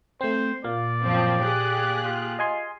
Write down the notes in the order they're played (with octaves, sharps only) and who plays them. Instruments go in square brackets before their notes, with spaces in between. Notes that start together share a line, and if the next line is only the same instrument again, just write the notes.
[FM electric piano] A3 C4 [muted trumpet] C5
[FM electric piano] A#2 A#3 F5 [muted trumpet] D5
[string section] F#2 F3 C4
G4 G#4 F#6
[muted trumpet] F4
[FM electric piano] D#5 G#5 C6